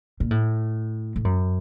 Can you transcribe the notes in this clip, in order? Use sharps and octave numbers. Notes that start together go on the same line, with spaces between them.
A#2
A2
A2
F#2